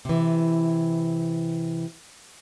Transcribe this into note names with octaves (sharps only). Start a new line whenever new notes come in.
C3 E3